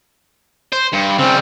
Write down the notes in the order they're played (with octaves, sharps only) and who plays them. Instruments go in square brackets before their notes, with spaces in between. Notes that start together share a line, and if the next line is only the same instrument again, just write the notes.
[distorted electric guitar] C5
G2
[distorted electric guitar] C#3 G3 [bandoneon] C4